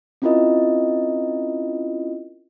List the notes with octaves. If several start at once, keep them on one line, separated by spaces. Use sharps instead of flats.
C4 C#4 E4 F4 A#4 D#5